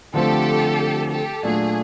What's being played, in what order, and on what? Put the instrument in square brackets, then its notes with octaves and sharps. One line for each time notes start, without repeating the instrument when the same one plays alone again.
[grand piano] D3 F3 A3 C4 [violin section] G4 A4
[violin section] G4 A4
[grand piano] A#2 F#3 A3 D4 F#4 [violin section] G#4